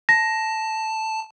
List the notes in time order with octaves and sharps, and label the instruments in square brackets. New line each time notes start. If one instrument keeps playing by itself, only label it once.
[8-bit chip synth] A5 [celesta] A#6